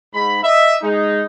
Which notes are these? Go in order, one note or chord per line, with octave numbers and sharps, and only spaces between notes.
G#2 B5
D#5 E5
G#3 D#4